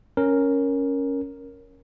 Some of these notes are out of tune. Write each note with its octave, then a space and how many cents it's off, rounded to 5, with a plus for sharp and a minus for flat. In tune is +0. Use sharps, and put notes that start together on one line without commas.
C#4 +0 A#4 +0